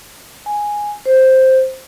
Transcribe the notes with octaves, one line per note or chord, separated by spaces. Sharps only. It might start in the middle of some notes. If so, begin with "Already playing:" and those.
G#5
C5